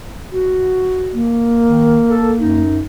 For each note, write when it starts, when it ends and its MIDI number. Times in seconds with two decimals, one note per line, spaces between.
0.31 1.20 66
1.13 2.62 58
1.68 1.98 51
2.10 2.33 69
2.40 2.82 42
2.40 2.82 63